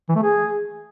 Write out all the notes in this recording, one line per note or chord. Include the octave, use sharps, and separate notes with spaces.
E3
A3
G#4